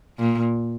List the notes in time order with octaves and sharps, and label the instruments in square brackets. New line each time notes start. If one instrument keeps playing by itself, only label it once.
[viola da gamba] A#2